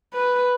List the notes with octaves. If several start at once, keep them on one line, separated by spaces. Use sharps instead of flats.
B4